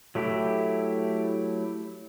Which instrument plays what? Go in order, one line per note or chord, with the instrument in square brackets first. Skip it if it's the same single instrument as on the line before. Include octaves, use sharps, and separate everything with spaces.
[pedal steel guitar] F#3 A3 E4 G4